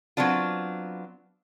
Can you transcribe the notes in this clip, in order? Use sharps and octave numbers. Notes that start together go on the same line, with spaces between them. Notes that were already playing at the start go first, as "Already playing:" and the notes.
F#3 B3 C4 D4 F4